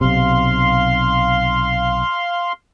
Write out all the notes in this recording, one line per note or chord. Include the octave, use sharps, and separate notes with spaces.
B1 C3 F5 C6